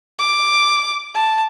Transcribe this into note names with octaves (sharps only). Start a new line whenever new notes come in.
D6
A5